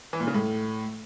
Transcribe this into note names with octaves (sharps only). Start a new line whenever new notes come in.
E3
A#2
C#3
A2